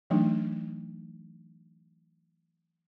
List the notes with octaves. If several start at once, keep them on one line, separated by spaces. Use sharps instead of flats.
E3 F#3 A3 D4 D#4